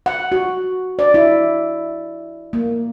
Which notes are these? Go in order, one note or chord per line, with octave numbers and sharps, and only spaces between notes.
F#5
F#4
D5
E4
A#3